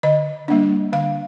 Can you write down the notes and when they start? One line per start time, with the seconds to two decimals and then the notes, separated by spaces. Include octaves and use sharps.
0.03 D3 D#5
0.48 G3 A#3 D4
0.93 D3 F5